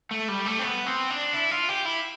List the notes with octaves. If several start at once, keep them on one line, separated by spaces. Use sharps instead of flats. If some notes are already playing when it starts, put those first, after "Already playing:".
A3
G3
A3
C4
B3
C4
D4
E4
F4
G4
E4